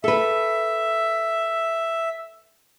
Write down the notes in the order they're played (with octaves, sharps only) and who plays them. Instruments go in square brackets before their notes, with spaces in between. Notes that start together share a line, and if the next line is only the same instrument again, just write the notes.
[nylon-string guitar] A4 B4 [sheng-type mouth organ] E5